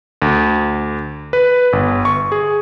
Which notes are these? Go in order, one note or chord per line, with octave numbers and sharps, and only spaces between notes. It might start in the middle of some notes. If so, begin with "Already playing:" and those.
D2
B4
G1
C#6
G#4